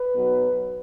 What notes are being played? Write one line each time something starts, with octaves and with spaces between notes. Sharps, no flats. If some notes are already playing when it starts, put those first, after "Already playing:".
Already playing: B4
B1 B2 F#3